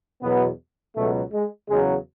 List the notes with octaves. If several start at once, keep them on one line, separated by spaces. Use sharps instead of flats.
E2 B2 F#3 B3
C#2 B2 F#3 A3
G#3
E2 C#3 F#3 G#3